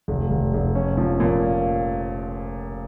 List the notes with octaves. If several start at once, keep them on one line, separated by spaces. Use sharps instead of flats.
F1
F1
F1
C#4
F3
A#2